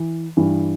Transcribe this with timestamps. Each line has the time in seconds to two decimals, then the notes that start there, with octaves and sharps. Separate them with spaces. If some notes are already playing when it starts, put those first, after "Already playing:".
Already playing: E3
0.37 G2 E3